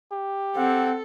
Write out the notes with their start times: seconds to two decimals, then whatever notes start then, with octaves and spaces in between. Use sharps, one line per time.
0.12 G4
0.56 C4 A4 F#5